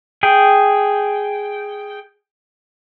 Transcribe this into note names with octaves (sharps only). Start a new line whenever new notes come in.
G#4 G5